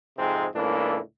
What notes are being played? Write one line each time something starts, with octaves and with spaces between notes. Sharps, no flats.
F2 G#2 C3 G#3 C4
C#2 A2 E3 A#3 D4